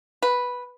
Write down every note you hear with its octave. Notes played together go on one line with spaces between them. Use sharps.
B4